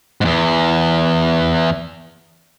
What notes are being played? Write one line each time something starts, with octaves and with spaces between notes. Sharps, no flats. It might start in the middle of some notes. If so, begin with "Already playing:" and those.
E2 G#2